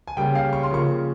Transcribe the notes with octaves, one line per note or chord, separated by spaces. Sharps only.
G#5
C#3 G3 A#3 C#4 G5
F5
C#6
C6
C#3 F3 A#3 C#6